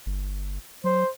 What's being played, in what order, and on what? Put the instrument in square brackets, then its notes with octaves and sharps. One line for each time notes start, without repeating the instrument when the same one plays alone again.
[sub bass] G1
[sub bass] F#3 [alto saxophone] C5